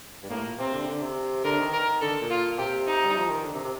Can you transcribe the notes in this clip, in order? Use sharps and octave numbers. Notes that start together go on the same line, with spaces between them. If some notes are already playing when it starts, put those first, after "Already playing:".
G2
A2 A#3
A#2
C3 C4
D3
D3
C3
D3 A#4
D#3
A#4
D3 A4
A#2
F4
C3 G4
D#4
G3
F3
D#3
D3
C3
C3